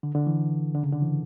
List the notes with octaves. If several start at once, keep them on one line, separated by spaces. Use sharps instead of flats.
D3
D3
E3
D3
C#3
D3
E3